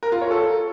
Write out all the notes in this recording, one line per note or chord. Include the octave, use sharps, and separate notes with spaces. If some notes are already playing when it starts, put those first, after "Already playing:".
A#4
F4
C#5
A4